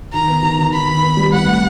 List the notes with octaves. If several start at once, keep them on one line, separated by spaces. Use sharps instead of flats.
D#3 A#5
B3
D#3
D#3
D#3 B5
D#3
B3
G3
C2 F#5
A3